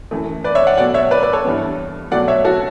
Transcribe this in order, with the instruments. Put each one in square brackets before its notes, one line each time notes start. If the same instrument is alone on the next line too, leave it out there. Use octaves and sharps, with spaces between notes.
[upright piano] F#2 E3 A3
B4 D5
C#5 E5
D5 F#5
B2 F#3 A3 D5 F#5
C#5 E5
B4 D5
B4 D5
A4 C#5
G2 E3 G3 B3
B2 F#3 A3 D5 F#5
C#5 E5
F#4 A4